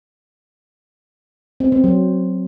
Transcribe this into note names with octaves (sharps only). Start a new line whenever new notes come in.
C4
C4
F#3